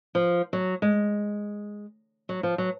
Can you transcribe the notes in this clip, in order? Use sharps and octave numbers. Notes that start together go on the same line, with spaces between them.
F3
F#3
G#3
F#3
F3
F#3